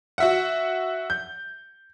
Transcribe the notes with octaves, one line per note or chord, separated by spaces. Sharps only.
F#4 E5 F#5
G6